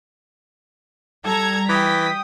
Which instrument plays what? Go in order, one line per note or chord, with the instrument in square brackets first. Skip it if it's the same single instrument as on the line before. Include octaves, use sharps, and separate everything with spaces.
[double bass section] G3 [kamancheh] A4 [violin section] A#5 G#6
[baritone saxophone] E3 [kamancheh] G5 D#6 [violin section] B6